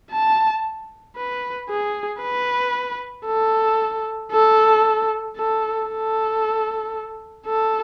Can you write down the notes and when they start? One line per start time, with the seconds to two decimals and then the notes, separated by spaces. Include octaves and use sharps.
0.11 A5
1.16 B4
1.69 G#4
2.21 B4
3.26 A4
4.32 A4
5.36 A4
5.88 A4
7.46 A4